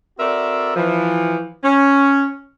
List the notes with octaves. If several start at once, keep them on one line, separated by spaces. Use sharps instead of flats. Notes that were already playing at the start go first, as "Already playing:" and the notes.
C4 F#4 A4 A#4 D5 E5
E3 F3
C#4